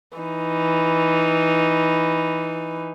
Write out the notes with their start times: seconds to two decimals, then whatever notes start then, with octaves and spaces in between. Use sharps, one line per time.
0.18 E3 D#4